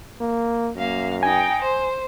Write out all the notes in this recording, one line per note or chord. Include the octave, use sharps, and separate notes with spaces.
A#3
F#2 A#3 F5
D#4 G5 G#5
C5